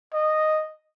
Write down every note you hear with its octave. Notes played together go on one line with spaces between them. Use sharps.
D#5